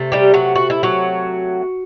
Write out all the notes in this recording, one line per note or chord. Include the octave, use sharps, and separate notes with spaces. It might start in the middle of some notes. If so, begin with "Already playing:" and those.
Already playing: C3 A3
G3 G4
F#3 F#4
F#4
E4
F#3 F#4